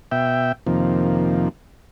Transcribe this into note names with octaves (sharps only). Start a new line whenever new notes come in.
B2 E5 G5
F2 C3 D#3 F3 A#3